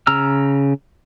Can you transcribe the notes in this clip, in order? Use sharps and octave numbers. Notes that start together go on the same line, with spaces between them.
C#3 A#5 E6 F6